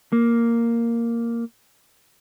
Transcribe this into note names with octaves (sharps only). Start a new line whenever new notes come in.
A#3